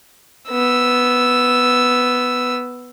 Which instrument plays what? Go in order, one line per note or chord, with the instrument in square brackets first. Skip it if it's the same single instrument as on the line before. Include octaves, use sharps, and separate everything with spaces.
[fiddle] B3 E6